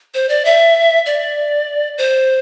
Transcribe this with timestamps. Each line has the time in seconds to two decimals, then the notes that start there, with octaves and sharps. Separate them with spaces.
0.14 C5
0.29 D5
0.45 E5
1.06 D5
1.98 C5